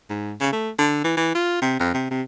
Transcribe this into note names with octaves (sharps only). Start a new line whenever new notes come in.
G#2
C#3
A3
D3
E3
E3
F4
C3
F2
C3
C3